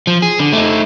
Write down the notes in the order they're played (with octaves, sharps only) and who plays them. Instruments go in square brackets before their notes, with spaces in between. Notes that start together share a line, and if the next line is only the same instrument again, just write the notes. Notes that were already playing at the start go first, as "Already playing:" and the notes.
[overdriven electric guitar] F3
G#4
D3
A3 D#4